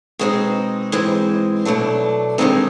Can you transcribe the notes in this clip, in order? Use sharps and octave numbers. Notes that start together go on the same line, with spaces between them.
B2 G#3 C4 D#4
G#2 E3 G#3 C4
B2 F#3 A3 D4
G2 D#3 G#3 C4 D#4